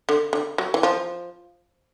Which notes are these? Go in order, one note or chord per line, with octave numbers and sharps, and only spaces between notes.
D3
D3
F#3
E3
F3